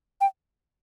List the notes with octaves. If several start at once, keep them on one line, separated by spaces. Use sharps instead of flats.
G5